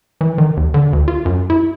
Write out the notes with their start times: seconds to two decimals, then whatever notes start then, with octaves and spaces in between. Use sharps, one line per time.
0.21 E3
0.38 D#3
0.57 D#2
0.74 D3
0.93 D2
1.08 F4
1.25 F#2
1.50 E4